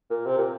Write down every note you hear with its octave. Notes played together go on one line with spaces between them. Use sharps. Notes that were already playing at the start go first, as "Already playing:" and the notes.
A#2
C3
A#2